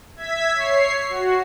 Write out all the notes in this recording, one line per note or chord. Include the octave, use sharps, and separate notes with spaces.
E5 G#6 B6
C#5 C7
F#4